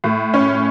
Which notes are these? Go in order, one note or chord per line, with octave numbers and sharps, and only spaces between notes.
A2
C#4